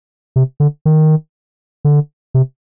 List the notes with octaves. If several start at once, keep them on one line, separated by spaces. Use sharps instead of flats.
C3
D3
D#3
D3
C3